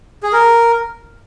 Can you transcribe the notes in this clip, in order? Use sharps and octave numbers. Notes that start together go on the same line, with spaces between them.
G#4
A#4